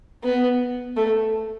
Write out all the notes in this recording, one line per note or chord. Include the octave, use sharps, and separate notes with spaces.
B3
A3